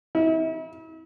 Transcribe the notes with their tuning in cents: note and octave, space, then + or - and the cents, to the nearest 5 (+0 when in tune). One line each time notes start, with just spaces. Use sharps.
E4 -40